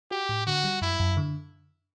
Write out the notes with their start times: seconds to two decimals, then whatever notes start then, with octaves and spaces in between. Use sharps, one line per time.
0.11 F#4 G4
0.29 A2
0.47 D3 F#4
0.64 G3
0.81 F#2 E4
1.00 F#2
1.17 D3